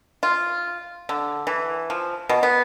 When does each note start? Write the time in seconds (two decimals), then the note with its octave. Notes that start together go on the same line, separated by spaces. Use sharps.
0.23 F4
1.09 D3
1.47 E3
1.90 F3
2.29 B2
2.43 B3